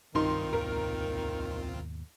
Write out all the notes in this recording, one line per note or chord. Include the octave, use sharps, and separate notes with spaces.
C2 G2 D#3 C4 D#4 F4 C6
D#2 G#2 B2 A#4